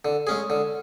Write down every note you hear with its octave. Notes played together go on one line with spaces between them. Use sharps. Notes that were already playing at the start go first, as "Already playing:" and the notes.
D3
G#3 C#4 G#4
D3